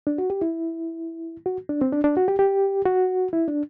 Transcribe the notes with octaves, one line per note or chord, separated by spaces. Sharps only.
D4
F#4
G4
E4
F#4
D4
C4
D4
D4
F#4
G4
G4
F#4
E4
D4